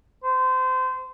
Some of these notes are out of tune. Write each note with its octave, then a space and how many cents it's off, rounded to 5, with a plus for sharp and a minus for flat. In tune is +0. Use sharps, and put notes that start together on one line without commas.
C5 -25